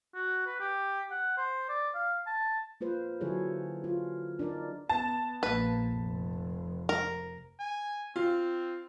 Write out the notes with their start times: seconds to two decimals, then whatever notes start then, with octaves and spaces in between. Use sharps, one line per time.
0.15 F#4
0.47 B4
0.60 G4
1.11 F#5
1.38 C5
1.69 D5
1.95 F5
2.27 A5
2.81 A#3 F4 B4 C5
3.21 D3 F#3 E4 G#4 A4 C#5
3.84 F4
4.39 D4 D#4 A#4 D5
4.89 B3 A5
5.43 A#1 A#3 B4
5.93 F1
6.89 A#4
7.59 G#5
8.16 C4 F4